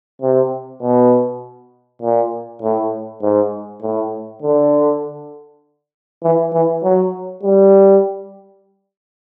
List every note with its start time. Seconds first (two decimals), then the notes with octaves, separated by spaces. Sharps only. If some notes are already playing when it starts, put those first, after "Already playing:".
0.22 C3
0.82 B2
2.02 A#2
2.62 A2
3.22 G#2
3.82 A2
4.42 D3
6.23 E3
6.53 E3
6.83 F#3
7.43 G3